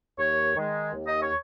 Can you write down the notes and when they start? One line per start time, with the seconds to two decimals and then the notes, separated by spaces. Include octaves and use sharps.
0.18 D#2 C#5
0.56 D#3 G#3
0.93 D#2
1.07 D#5
1.21 C#5